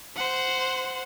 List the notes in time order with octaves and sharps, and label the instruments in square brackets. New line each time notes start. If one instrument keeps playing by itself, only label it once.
[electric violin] C5 F#5